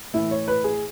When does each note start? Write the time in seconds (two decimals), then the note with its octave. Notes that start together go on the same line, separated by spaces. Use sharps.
0.13 A2 E3 E4
0.31 C#5
0.48 B4
0.64 G#4